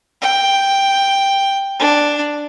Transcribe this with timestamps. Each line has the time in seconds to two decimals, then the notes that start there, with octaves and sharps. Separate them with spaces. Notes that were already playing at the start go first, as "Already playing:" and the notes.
0.21 G5
1.79 D4